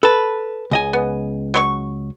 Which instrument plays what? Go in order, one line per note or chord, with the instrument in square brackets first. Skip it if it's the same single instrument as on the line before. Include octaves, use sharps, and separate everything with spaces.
[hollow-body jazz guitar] A4 A5 [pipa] B4
[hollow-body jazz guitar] C#2 D#5 G#5
[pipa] B3
F#3 C5 C#6